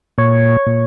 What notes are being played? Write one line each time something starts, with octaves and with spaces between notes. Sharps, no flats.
A#2 C#5
A#2